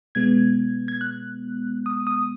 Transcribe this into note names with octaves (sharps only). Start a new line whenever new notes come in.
B2 G#3 B3 G#6
G#6
F#6
D#6
D#6